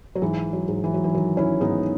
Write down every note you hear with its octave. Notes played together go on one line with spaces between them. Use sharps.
F#3
G#2 E3
F#3
G#2
E3
F#3
E3
D#3 F#3
C#4 E4
G#2 B3 D#4